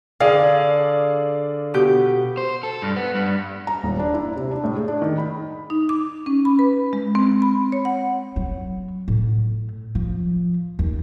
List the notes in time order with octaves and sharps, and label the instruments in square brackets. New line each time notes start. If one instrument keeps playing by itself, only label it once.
[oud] D3 [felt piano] G#4 D5 F5
[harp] B2 G4 G6
[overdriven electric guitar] C5
A4
G2
B3
G2
[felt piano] A#5
D#1
D4
E4
C3
D4
A2
G#4
D4
D#3
B5
[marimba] D#4
D6
C#4
B5
B4
G#3
C4
B5
C#5
F#5
[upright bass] F#3
A2
F3
D#2